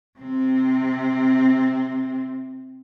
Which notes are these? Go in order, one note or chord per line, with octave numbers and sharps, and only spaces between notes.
C3 C4